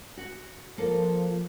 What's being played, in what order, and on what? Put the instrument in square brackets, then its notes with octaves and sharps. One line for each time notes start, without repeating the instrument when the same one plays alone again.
[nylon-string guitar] F#4
[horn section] F3 [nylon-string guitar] A#3 A4